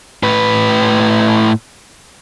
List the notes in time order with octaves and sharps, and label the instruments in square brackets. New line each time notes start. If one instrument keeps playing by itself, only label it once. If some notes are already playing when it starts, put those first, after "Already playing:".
[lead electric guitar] A2 B4